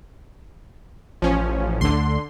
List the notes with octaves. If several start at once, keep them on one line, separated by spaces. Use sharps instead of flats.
A1 F3 C#4
D2 D3 C6